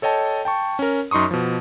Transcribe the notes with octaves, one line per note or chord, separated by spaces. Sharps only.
A4 C#5 D#5 G5 A5
G5 A5 C#6
C#4 A#4
F#2 D#4 C6 C#6 D#6
B2 F3